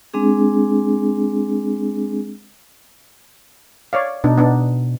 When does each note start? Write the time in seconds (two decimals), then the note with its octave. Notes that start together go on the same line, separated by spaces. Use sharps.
0.14 G#3 C4 D4 G#4
3.93 C#5 D5 F5
4.24 B2 D4 D#4
4.38 B3 D4 D#4